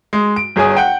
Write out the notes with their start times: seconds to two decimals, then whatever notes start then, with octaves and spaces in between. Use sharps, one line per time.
0.13 G#3
0.36 D7
0.56 G1 G#4 C#5 G#5 D#6
0.77 F#5 G5